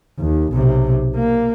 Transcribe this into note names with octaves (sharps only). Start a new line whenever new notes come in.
D#2
B1 C3
A#3